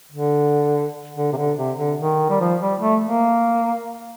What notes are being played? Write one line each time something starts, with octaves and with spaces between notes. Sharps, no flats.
D3
D3
C3
D3
C3
D3
D#3
G3
F3
G3
A3
A#3